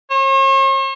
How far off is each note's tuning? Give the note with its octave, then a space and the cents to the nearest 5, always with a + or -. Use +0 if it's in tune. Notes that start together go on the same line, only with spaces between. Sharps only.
C#5 -45